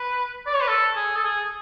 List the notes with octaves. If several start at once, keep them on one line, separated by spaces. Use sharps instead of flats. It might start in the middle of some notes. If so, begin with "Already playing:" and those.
Already playing: B4
D5
C#5
B4
A4
G#4
A4
G#4